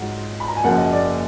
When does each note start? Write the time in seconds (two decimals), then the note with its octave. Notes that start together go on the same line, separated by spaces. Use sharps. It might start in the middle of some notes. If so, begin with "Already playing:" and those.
Already playing: G#2 F#3 F4 F#5
0.40 B5
0.48 A#5
0.56 G#5
0.64 F#1 F#2 F3 A#3 F#5
0.78 D#5
0.92 D5